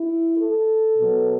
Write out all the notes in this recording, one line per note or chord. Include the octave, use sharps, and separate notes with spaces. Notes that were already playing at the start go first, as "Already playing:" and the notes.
Already playing: E4
A4
B2 F#3